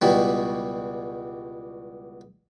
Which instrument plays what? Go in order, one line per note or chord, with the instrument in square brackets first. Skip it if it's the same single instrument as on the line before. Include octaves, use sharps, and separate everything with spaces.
[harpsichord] C#2 B2 E3 G3